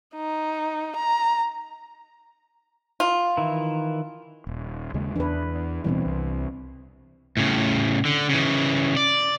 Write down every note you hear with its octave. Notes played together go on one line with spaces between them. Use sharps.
D#4
A#5
F4
D#3 E3 E4
D#1
D#2 C#3 G#3
E2 E3 D4 B4
D1 B2 E3 G3 C4
C2
A2 C#3
D3
C#3 E3
D5